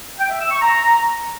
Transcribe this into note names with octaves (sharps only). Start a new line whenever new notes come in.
G5
E5
E6
C#6
A#5